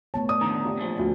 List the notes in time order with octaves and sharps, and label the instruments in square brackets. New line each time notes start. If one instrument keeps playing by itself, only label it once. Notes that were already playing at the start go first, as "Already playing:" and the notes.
[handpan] A3 B3 C#5 [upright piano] A5
[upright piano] D5 [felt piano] D#6
[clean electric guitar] E2 D3 D#3 [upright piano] A#5
[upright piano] F4 G4 D5
[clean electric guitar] A#2 F3
[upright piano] D2